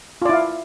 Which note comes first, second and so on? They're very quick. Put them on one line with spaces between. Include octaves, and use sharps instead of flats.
F4 D5 E4 F5